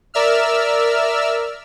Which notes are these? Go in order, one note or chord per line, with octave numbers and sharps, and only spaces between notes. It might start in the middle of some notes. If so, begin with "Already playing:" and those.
A#4 D5 E5 E6 F6